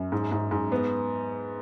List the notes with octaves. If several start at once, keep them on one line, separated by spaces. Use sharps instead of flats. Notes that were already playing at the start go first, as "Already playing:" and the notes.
Already playing: F#2
G#2
G#2
G#2
B3